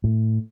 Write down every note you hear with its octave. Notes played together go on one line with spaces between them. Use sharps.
A2